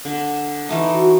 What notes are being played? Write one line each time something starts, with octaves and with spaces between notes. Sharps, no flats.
D3
E3 A3 D#4
F#4